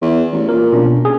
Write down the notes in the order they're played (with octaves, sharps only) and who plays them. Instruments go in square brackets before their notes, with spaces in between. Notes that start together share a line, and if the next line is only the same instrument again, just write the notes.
[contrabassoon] E2
A1
[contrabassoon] A#2 [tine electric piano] A#4
[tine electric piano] B2 C#4 D4
G#4